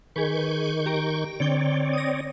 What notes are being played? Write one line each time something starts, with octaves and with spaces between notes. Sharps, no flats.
D#3 G#4 B4 C#6 G6
G4 A#5 D7
D3 C4 C#5 D5 G7
D#6 A#6